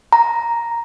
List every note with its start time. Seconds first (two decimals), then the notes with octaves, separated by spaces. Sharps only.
0.13 A#5